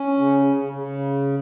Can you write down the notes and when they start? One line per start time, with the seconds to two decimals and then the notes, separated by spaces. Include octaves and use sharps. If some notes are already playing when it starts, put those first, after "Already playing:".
Already playing: C#4
0.18 C#3
0.45 C#3
0.73 C#3